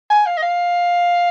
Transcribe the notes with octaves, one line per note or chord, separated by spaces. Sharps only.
G#5
F5
D#5
F5